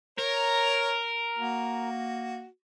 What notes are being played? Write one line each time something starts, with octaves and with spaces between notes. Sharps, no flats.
A#4 C#5 A#5
A#3 F#4